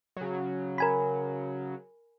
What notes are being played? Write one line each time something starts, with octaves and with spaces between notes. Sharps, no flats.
C#3 F#3
A#4 G#5 B5